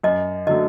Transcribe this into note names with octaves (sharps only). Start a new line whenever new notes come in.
F#2 D#5
D3 F#3 A3 D#5